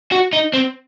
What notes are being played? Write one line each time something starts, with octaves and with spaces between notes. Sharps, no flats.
F#4
D#4
C4